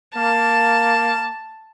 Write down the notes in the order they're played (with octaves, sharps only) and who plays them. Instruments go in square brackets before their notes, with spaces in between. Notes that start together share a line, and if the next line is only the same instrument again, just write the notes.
[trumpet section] A#3 [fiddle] A5